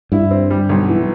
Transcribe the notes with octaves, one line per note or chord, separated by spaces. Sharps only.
G2 E4
C4
G3
B1
E3